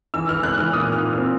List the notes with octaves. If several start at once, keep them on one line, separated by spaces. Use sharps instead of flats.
E3 E6
E3 F6
G#3 F#6
E3 F6
A#2 D#6
A#2 F6
A#2
E6
C4